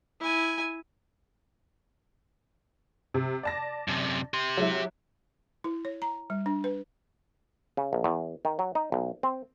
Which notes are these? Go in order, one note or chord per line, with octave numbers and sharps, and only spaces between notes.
E4 G#5
C3
D5 A5 A#6
F#2 C3
G4 C6
F#3 G#3 E4
E4
C#5
A#5
G3
D4
B4
C#3
A#1
E2
D#3
F#3
D#4
B1
C4